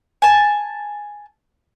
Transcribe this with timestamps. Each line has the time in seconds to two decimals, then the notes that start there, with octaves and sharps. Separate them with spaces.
0.22 G#5 A5